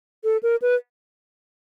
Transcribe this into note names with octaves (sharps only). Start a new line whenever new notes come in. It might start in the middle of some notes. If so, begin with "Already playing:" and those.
A4
A#4
B4